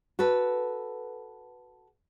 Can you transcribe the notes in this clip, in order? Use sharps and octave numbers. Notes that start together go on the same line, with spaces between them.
F#4 A4 B4